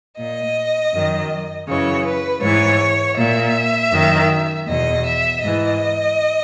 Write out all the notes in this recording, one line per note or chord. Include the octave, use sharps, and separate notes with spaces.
A#2 D#5
F#2 D#3
F#2 C#3 E3 C#5
B4
G#2 E3 C#5
A#2 E5
F#2 D#3
E2 B2 D#5
E5
G#2 E3 D#5